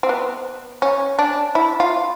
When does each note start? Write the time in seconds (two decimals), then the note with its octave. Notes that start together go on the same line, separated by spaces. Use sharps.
0.03 C4
0.09 B3
0.82 C#4
1.19 D4
1.55 E4
1.80 F4